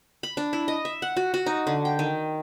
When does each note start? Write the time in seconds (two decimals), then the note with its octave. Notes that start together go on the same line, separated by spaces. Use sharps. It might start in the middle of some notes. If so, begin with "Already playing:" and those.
0.23 B5
0.37 D4
0.53 E4
0.68 D#5
0.85 E5
1.02 F#5
1.17 F#4
1.34 F#4
1.46 D#4
1.67 D3
1.85 G5
1.99 D#3